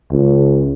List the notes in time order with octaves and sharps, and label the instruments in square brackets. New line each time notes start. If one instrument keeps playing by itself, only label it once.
[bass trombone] C#2